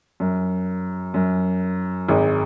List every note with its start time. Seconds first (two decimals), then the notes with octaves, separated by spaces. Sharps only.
0.20 F#2
1.14 F#2
2.09 G#1 G#2